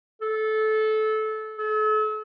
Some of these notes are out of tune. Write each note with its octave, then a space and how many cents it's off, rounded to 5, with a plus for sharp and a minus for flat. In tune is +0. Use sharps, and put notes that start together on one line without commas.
A4 -20
A4 -40